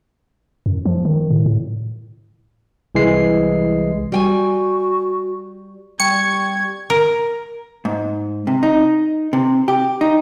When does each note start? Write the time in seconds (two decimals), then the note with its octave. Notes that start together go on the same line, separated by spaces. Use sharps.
0.66 F#2
0.85 F3
1.05 D#3
1.31 A2
1.46 A2
2.95 C2 E3 G#3 C7
4.12 G3 F#4 G5 G#5
6.00 G3 G5 C#6 G#6 C#7
6.90 A#4
7.85 G#2
8.47 C3
8.63 D#4
9.33 C3
9.68 G4
10.01 D#4